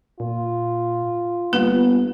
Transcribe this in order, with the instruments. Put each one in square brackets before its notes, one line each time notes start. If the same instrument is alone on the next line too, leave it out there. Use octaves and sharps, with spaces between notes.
[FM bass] A#2 [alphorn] F4
[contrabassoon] G1 [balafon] A#3 B4 [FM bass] B3